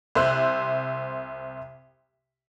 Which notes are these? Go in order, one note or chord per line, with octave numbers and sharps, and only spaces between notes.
C2 C5 E5 F#6